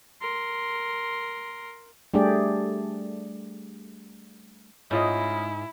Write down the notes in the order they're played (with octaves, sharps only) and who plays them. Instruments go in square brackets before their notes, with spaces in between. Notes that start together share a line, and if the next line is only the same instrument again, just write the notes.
[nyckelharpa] A#4 C6
[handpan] G3 A3 D4 G4 G#4 D5
[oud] G#2 [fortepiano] C#4 F4 D#5 [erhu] E4